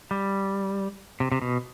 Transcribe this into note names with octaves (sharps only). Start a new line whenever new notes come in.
G3
C3
C3
B2